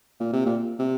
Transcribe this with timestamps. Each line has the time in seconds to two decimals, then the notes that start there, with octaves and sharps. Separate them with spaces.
0.20 A#2
0.33 C3
0.46 A#2
0.79 C3